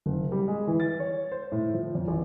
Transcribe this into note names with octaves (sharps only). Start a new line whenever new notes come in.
F#1
G3
G#3
E3
A6
C#5
C5
A2
F3
F2
A1